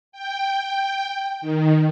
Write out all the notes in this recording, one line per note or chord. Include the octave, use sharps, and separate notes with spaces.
G5
D#3